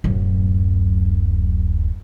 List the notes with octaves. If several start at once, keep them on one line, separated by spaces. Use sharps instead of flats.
D1 F#2